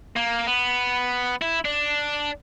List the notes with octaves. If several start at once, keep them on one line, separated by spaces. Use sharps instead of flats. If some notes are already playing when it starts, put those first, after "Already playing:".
A#3
B3
E4
D4